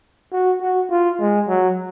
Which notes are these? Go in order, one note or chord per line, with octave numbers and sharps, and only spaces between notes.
F#4
F#4
F4
G#3
F#3